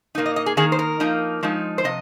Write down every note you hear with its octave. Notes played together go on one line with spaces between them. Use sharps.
A#2 A#3 D#4
D#5
D#5
G#4
D#3 A#3 D#4 G#4
C5
A#4
F3 A#3 D#4
F3 G#3 D#4
C5
C3 F3 D#5